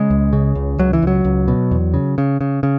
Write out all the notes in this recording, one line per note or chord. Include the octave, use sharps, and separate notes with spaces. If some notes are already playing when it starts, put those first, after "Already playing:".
Already playing: C#3 G#3
C#2
C#3
C#2
C#2 F#3
E3
C#2 F#3
C#2
B2
E2
C#3
C#3
C#3
C#3